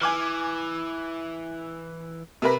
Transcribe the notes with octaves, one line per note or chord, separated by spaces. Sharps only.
E3 G#5 D6 F6
C3 A#4 B4